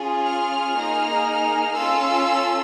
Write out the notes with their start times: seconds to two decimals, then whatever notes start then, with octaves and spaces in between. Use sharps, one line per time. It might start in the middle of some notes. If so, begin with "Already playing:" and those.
Already playing: C#4 F4 G#4
0.24 F6
0.75 A#3 D#4 G#4
1.75 C#4 F4 A4 E6